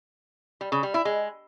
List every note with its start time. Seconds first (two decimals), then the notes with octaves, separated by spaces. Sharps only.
0.61 G3
0.72 C#3
0.83 G3
0.94 E4
1.05 G#3